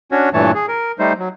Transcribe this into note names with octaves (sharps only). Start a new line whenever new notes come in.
C#4 D4 F#4 C#5
G2 A#2 E3 A3 C#5 A5
G#4
A#4
G3 A3 D#4 C5
F#3